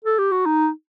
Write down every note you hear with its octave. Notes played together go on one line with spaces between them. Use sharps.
A4
G4
F#4
D#4